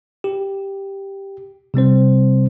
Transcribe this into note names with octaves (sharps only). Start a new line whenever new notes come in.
G4
C3 G3 C4 C5